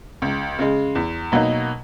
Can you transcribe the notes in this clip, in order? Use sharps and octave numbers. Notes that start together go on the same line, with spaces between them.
C#2
C#3 G#3
E2
B2 F#3 A#3 D#4